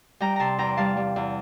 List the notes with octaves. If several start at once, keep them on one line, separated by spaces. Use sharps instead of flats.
G3 G5 A#5
C3 A5 A#5 C6
E2 G5 A#5
G3 F5 A5
G3
E2